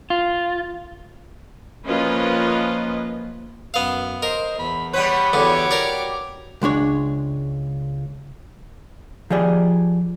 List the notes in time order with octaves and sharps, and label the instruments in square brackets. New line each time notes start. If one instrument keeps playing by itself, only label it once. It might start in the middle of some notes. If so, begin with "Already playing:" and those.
[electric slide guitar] F4
[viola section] F3 A#3 C#4 F4 B4 D#5
[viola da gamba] F#2 [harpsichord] B3 F5
[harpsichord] A#4 [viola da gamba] C5 [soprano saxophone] D#5
[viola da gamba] E2 [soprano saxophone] B5
[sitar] G3 B3 B4 [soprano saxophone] C#5
[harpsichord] E2 D3 [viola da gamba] F#4 G4 C#5 [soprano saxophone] D6
[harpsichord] A#4 D5
[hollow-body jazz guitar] C#2 G#3 D4 C#5
F3 G4 G#4 D5